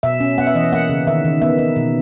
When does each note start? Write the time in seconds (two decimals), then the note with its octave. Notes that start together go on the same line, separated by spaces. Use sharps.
0.03 B2 E5
0.20 C#4
0.38 B3 F#5
0.47 E5
0.55 E3 D#5
0.64 E5
0.72 A#3 F#5
0.90 C#3
1.07 D#3 E5
1.25 D#3
1.42 B3 E5
1.59 D#4
1.76 B2